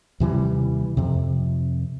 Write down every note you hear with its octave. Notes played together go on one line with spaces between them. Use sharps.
D#2 C3 E3 G3
F2 C3